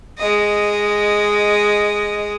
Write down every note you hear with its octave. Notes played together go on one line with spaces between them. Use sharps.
G#3 D#5